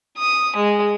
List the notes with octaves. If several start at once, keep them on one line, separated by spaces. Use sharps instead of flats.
D#6
G#3